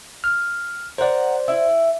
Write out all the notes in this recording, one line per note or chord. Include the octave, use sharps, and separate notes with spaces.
F6
A#4 C5 D5 F#5
E4